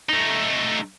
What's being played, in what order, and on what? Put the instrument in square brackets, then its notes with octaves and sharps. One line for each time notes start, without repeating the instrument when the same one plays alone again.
[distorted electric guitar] A3 D#4